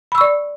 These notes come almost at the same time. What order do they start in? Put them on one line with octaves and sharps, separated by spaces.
B5 E6 C#6 D5